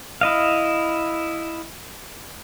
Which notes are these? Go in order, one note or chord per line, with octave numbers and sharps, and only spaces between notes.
E4 D#5 F5